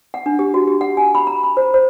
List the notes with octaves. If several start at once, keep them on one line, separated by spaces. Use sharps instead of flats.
F#5
D4
G4
F#4
G4
F#5
G#5
B5
A#5
B5
C5
C5